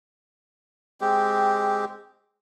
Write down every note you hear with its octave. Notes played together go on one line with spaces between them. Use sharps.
G#3 C4 G4